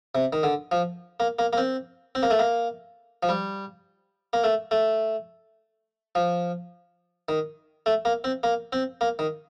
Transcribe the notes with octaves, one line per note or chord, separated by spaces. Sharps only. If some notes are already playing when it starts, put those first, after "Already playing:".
C3
D#3
D3
F3
A#3
A#3
A#3
C4
C4
A#3
A3
A#3
F3
G3
A#3
A3
A3
F3
D#3
A3
A#3
C4
A#3
C4
A#3
D#3